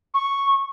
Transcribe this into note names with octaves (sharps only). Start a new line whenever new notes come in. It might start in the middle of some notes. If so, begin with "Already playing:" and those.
C#6